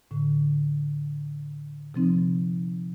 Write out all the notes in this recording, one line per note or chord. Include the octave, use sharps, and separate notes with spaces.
A2 D3
C3 F3 C4 D#4